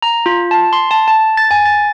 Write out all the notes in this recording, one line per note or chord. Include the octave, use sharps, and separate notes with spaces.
A#5
F4
A5
C6
A5
A5
A6
G#5
A6